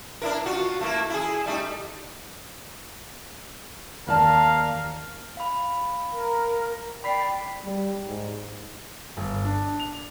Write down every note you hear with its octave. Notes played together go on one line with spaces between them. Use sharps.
D4 E4 A#4
F4 F#4
A3 A#3 E4
E4 G#4
G3 A3 D#4
D#2 A#4 D5 F5 A5
F5 B5
A#4
D5 G5 B5 B6 C7
G3
G#2
G1
D4
F7